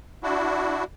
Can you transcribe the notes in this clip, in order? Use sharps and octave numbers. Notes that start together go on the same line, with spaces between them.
D4 E4 F#4